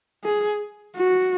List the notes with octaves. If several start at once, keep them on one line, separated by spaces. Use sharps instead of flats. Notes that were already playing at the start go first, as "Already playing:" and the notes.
G#4
F#4